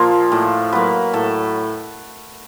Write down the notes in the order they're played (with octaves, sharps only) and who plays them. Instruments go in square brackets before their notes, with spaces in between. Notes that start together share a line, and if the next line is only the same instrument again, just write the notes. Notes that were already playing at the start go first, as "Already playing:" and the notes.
Already playing: [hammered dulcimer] A#2 F3 A#3 F4
A2
F#3 A#3 B4
A2 A4